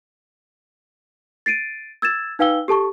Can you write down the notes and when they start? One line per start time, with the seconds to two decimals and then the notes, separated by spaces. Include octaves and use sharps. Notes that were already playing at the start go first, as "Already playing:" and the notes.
1.46 A6 C7 D7 D#7
2.02 E6 G#6 A6 E7
2.39 D#4 B4 F5 G5 E6 G7
2.68 G4 A4 A5 C#6